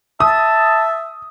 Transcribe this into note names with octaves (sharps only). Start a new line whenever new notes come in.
E5 A5 D#6